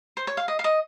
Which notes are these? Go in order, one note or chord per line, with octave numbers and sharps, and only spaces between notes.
C5
C#5
F5
D#5
F5
D#5